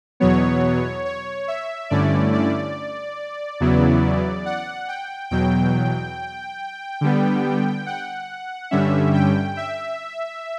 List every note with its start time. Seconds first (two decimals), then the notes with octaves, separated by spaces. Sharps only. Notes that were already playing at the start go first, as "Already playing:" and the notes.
0.20 E2 B2 F#3 B3 C#5
1.05 C#5
1.48 E5
1.90 G2 D3 A3 C#4 E4 D5
2.33 D5
3.60 E2 C#3 F#3 B3 E4
4.46 F#5
4.88 G5
5.30 E2 B2 F#3 G5
7.01 D3 G3 B3
7.86 F#5
8.71 G2 D3 G3 C#4 E5
9.14 G5
9.57 E5